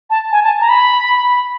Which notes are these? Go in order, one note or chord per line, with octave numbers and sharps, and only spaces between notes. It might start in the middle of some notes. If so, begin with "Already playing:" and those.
A5
G#5
A5
A#5
B5